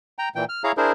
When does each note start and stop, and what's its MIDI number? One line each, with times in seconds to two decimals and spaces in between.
0.19 0.29 79
0.19 0.29 82
0.35 0.45 46
0.35 0.45 52
0.35 0.45 79
0.49 0.63 89
0.64 0.72 64
0.64 0.72 68
0.64 0.72 73
0.64 0.72 77
0.64 0.72 82
0.77 0.92 62
0.77 0.92 64
0.77 0.92 68
0.77 0.92 70
0.77 0.92 72